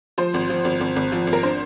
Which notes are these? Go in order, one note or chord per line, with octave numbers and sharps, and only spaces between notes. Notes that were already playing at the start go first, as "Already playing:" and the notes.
F3 C5
G#1
F3
G#1
G#1
G#1
F3
G#1
A#4
D4 C5